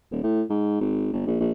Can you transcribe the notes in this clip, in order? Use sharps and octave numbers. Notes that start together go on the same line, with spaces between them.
D#1
A2
G#2
G#1
G1
A#1
A#1